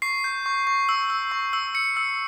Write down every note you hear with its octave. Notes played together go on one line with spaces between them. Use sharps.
C#6 C7
G6
C#6
C#6
E6
E6
C#6
E6
E6 C#7
E6